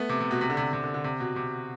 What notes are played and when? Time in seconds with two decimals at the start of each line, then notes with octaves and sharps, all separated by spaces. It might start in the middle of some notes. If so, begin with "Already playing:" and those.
Already playing: A3 B3
0.09 C3
0.21 C3
0.31 B2
0.41 C3
0.50 D3
0.57 C3
0.73 C3
0.84 D3
0.94 D3
1.04 C3
1.20 B2
1.36 C3